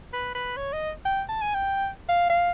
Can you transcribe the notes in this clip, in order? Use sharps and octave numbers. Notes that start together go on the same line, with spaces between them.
B4
B4
C#5
D#5
G5
A5
G#5
G5
F5
F5